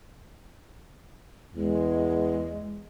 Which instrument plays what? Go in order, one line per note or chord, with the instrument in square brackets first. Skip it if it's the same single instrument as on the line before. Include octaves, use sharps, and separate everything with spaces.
[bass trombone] E2 [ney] G#3